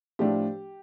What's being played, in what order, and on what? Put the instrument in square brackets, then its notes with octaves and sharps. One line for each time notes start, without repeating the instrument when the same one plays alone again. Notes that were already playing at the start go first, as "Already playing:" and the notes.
[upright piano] A2 F3 A3 D4 G4